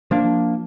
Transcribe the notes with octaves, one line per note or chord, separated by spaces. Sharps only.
F3 A#3 D4